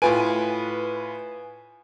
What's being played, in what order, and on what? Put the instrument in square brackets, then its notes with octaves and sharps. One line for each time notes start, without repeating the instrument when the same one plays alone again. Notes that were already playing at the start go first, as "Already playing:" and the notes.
[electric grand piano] A2 F4 D7 [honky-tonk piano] B4 [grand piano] G#5